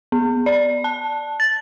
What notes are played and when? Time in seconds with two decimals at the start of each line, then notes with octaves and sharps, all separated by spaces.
0.12 B3
0.46 D5
0.84 A5
1.40 A6